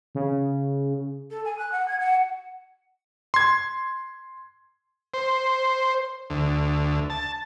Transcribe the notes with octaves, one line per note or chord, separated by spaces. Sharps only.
C#3
A4
G#5
F#6
F#5
G#6
F#5
C6 G#6
C5
D2
A5